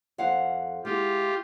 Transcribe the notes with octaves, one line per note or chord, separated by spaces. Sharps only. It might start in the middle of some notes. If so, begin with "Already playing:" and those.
F2 F5 F#5
G#3 E4 F4 G4